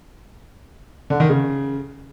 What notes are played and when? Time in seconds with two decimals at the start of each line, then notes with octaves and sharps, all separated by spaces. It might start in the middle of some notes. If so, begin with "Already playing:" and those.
1.10 D3
1.20 D#3
1.30 C#3